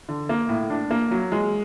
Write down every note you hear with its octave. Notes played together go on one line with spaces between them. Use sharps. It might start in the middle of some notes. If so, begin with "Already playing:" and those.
D3
A#3
A2
D4
A#3
F#3
G#3